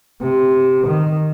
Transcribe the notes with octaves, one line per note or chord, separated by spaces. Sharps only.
C3
D#3